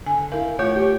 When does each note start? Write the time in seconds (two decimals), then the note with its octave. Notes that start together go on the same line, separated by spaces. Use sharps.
0.06 D3 G#5
0.32 E4 A#4 F5
0.59 A3 F4 C#5
0.76 G4